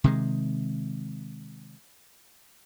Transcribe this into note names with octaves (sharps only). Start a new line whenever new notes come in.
C3 D#3 G#3